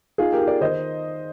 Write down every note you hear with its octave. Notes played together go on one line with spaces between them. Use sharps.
D#4 F4 G#4
G4 A#4
D#4
A#4 D5
D#3 C5 D#5